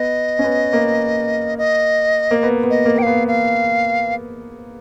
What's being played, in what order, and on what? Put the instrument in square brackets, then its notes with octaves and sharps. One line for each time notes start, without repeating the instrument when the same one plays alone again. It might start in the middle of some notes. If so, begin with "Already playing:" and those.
Already playing: [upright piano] B3 [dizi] D#5
[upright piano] C#4
B3
A#3
[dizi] D#5
[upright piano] A#3
B3
B3
[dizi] D#5
[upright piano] A#3
[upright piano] A#3 [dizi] G5
[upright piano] B3 [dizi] F5
[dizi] F5